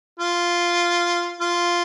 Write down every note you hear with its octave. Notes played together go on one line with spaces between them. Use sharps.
F4
F4